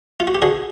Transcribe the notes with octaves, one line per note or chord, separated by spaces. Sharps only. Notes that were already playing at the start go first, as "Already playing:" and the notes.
F4
F#4
G4
D3 F#4 G#4